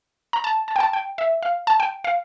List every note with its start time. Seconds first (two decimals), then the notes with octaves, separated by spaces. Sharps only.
0.33 A#5
0.44 A5
0.68 A5
0.76 G5
0.80 A5
0.93 G5
1.18 E5
1.43 F5
1.67 A5
1.80 G5
2.04 F5